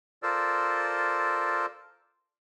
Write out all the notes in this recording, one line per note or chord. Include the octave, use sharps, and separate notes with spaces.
F4 A4 A#4 C5 D5 E6